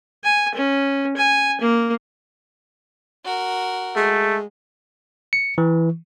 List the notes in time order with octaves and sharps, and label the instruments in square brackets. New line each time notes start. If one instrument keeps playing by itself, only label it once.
[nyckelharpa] G#5
C#4
G#5
A#3
[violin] F#4 A#4
[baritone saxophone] G#3 [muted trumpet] A3
[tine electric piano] C#7
E3